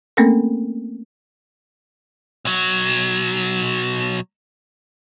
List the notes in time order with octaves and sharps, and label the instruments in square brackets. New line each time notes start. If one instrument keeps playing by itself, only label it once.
[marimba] A3 A#3 C4 C#4 A4 A#4
[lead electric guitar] B1 F#3